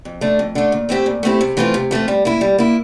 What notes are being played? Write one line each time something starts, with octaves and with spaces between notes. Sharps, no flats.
F2
D3 A3 D4
F2
D3 A3 D4
A#2
A3 C4 E4 G4
A#2
A3 C4 E4 G4
C3
E3 A3 C4 F4
C3
E3 A3 C4 F4
G3
A#3 E4
G3
A#3 E4